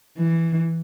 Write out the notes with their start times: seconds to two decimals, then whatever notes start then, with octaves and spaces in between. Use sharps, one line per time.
0.18 E3